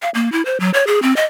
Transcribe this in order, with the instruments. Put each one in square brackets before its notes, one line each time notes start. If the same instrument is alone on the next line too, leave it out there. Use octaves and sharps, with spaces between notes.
[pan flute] F5
A#3
E4
C5
F#3
C#5
G#4
C4
D#5